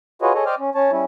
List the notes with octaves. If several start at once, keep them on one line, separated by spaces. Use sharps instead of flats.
F4 F#4 G#4 B4 C#5 D#5
G#4 A4 C#5 D#5
C5 D5 D#5 G5 D6 F6
C#4
C#4 C#5 A5
G3 C#4 E4